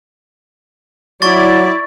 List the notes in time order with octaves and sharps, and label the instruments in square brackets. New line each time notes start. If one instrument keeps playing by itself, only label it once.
[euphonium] F#3 [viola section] E4 D5 [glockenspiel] C#6 A6